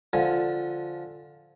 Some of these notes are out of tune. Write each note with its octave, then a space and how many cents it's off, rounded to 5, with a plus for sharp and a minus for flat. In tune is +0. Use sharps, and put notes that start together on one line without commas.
D3 +0 F3 +5 G#5 +0